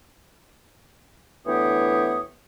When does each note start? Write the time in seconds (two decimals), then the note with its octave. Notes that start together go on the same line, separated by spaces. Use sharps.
1.47 D2 E3 B3 G4 C#5 D#6